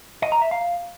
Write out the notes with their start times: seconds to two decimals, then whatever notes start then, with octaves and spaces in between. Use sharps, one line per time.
0.22 D#5
0.32 A#5
0.42 E5
0.51 F5